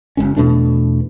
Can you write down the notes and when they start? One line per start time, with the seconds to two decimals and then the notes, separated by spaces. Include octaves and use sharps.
0.17 F#1 G#3 C#4
0.37 E2 B2 A3 D4